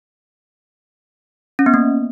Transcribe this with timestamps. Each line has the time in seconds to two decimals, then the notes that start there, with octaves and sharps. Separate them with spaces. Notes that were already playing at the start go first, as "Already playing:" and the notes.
1.59 C#4
1.66 B3
1.74 A#3